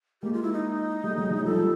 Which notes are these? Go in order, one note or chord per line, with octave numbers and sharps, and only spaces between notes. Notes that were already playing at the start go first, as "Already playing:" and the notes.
G#3 A#3 G4
F4
E4
D#4
G3 A3
F#3 G#3
F#3 G#3
F3 G3 A4
F3 G3